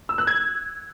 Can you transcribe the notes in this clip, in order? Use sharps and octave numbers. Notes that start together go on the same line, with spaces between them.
E6
F#6
G#6